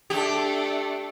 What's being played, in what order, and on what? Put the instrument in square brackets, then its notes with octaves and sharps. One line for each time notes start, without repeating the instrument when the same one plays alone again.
[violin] A3 D4 [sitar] G4